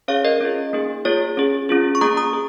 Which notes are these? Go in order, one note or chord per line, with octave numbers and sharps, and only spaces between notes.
C#4 G#4 C#5 F5
A#4 D#5
C#4 F4 G#4
A#3 D#4 G#4
A#3 F4 G#4 C#5
C#4 G#4
C#4 F4 G#4
C#6
A#3 C#4 G#4 A#5 D#6
A#5 D#6
G#4